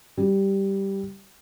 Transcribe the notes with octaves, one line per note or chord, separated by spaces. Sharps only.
G3